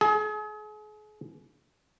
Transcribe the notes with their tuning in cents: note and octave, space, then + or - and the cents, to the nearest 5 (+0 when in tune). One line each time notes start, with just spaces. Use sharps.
G#4 +40